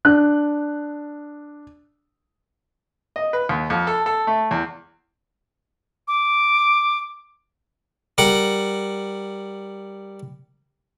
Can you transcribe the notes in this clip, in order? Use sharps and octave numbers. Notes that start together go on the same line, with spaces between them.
D4 F#6
D#5
B4
D#2
F2
A4
A4
A3
E2
D6
G3 A#4 F#5